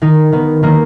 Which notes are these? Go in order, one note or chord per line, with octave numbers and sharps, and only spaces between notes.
D#3 D#4
D#3 B3
D#3 A#3